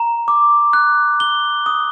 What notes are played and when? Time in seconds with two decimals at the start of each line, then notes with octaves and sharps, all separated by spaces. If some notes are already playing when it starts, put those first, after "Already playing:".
Already playing: A#5
0.28 D6
0.73 F#6
1.20 G7
1.66 D#6